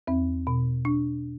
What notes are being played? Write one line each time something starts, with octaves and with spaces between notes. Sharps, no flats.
E2 C4
B2
D4